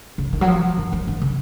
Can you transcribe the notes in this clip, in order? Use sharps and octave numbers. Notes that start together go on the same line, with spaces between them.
C#3
D#3
F#3
F3
D#3
F3
D#3
C#3